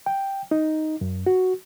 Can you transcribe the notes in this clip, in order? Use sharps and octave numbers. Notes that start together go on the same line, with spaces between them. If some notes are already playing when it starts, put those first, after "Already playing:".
G5
D#4
F#2
F#4